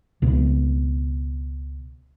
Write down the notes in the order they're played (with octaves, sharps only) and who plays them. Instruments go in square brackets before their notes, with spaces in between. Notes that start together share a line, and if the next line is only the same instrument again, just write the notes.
[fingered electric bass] C#2 B2